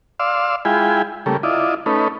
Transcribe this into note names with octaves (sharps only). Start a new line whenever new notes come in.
D5 F5 C6 E6
G#3 E4 F4 G5 G#5 B5
C#3 G3 A3 A#3
E4 F4 D5 D#5
A3 C#4 D#4 B4